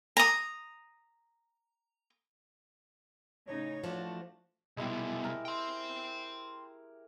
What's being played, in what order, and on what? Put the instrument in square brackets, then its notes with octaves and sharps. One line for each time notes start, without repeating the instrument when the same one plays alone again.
[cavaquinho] A#5 D#6
[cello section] A2 C#3 D#4 [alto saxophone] C#5
[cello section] E3 F#4 [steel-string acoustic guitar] F3 A3 D4
[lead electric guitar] C2 B2 [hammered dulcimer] G#3 E4 G4
[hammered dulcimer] A#4
[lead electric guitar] G5 C6